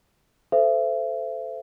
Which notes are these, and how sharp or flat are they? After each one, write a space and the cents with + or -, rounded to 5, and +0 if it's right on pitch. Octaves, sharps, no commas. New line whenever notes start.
A4 +0 C5 -20 E5 +35